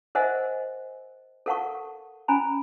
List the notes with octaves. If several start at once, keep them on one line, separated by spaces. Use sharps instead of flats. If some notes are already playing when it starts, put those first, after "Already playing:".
A#4 C5 D#5 E5 F#5 G#5
A4 A#4 F5 F#5 A5 C#6
C#4 G#5 A#5 B5